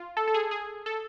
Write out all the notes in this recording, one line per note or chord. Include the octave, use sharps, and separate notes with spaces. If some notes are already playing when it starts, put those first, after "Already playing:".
Already playing: F4
A4
A4
G#4
G#4
A4